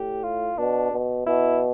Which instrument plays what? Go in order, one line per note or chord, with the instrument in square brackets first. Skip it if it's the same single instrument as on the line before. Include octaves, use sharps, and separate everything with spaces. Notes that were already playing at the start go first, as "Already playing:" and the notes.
Already playing: [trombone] A2 [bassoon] G4
[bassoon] F4
[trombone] B2 [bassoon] D4
[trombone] B2
[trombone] B2 [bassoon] E4